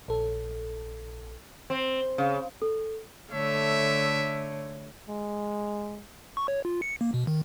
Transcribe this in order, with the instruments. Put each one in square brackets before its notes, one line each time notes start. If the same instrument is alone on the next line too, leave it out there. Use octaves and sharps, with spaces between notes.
[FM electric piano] A#1 A4
[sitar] C4
C#3
[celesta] A4
[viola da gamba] D3 A3 C#5 [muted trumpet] E5
[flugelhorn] G#3
[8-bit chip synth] C#6
C#5
F4
C#7
A#3
B2
D#3